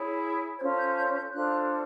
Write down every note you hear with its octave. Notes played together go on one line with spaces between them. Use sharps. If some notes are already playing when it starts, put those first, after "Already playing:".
Already playing: E4 G#4 C#5
C#4 F4 A4 C5 G#6
G6
G6
G6
D4 F4 A4 C5 F#6